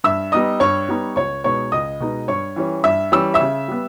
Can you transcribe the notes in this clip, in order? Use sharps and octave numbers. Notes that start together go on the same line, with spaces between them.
G2 E5 E6
G3 B3 D#4 D#5 D#6
G2 C#5 C#6
G3 B3 D#4
C#2 C#5 C#6
B2 G#3 B3 D#4 C#5 C#6
C#2 D#5 D#6
B2 G#3 B3 D#4
G2 C#5 C#6
E3 G3 C#4
G2 E5 E6
E3 G3 C#4 E6
E5 E6
C#3
G3 B3